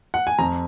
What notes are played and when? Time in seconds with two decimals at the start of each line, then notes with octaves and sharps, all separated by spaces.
0.14 F#5
0.27 G#5
0.39 F2 A#5